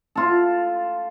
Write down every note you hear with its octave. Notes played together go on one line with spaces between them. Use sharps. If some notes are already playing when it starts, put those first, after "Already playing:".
F4 A4